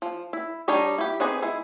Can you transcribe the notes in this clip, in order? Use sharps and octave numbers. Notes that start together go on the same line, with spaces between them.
F3
E4
G3 D4 D#4 C#5 D#5
E4 G4
B3 C4 D#4 G#4 C5
G#3 E4